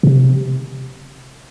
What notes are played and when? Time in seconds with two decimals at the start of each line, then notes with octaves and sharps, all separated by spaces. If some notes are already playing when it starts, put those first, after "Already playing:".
0.03 B2
0.07 C3